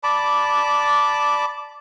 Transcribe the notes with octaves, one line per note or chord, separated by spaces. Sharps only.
D5 A5 B5 D6